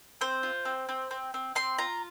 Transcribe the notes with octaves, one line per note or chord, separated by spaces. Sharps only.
C4 C5
F4
C4
C4
C4
C4
C4 C6
F4 A#5